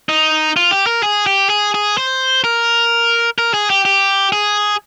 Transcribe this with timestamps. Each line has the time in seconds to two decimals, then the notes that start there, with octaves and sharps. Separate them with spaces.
0.09 D#4
0.57 F4
0.71 G4
0.87 A#4
1.03 G#4
1.27 G4
1.50 G#4
1.74 G#4
1.98 C5
2.44 A#4
3.38 A#4
3.54 G#4
3.70 G4
3.85 G4
4.32 G#4